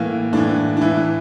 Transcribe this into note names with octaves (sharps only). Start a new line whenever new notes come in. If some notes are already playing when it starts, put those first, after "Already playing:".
Already playing: A2 E3 A#3
A2 E3 D4
D4
A2 E3 E4